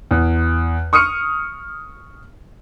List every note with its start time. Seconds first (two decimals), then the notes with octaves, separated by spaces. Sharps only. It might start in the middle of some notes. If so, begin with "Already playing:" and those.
0.11 E2
0.93 C#6 D#6 F6 C#7 D#7